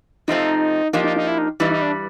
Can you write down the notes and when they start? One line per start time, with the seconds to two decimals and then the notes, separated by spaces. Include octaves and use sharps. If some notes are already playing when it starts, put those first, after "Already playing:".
0.28 F2 C3 F3 A3 C4 D#4
0.93 F3 A#3 D4 D#4 G4
1.04 D#4
1.16 D#4
1.28 E4
1.38 D#4
1.60 G2 E3 G3 D#4
1.71 D#4
1.82 D4